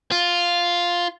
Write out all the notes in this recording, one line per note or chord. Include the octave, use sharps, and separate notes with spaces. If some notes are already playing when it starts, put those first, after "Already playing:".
F4